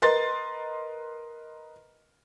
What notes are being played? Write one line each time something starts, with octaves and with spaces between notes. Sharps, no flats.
A#4 B4 D#5 C6 A6